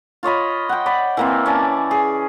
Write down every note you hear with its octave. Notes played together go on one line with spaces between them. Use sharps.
F4 C#5 D#5 B5
F#5 G5
D5 B5
E3 A#3 C4
C#4 D5 A5
G#4